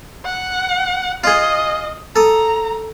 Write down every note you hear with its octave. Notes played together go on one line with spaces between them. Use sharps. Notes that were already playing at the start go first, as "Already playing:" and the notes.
F#5
F4 G#4 D#5
A4 A#5 D#6